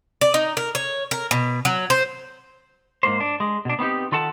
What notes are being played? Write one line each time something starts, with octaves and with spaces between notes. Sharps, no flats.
D5
D#4
A#4
C#5
A#4
B2
F#3
C5
G#2 A#3 C5
D4
G#3
B2 D4
B3 C4 D#4 G4
D#3 F4 A4 F#5 A5